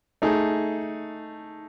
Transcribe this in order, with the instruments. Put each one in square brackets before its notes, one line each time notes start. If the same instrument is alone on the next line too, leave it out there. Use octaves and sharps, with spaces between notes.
[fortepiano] A3 D#4 G#4